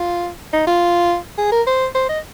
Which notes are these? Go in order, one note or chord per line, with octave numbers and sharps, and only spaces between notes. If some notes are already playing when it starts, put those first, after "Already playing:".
Already playing: F4
D#4
F4
G#4
A#4
C5
C5
D#5